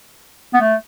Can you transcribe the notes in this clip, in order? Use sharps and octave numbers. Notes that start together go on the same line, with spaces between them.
B3
A3